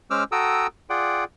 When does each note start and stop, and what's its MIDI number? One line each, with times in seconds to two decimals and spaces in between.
0.10 0.24 56
0.10 0.24 61
0.10 0.24 72
0.10 0.24 86
0.10 0.24 88
0.10 0.24 89
0.32 0.67 66
0.32 0.67 69
0.32 0.67 79
0.32 0.67 82
0.32 0.67 87
0.32 0.67 88
0.90 1.24 65
0.90 1.24 68
0.90 1.24 74
0.90 1.24 78
0.90 1.24 79